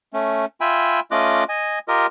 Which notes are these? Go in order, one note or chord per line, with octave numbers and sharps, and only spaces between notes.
A3 C#4
F4 E5 G5 G#5 B5
A3 C#4 F4 D#5 D6 F#6
D#5 G#5
F4 G4 A#4 D#5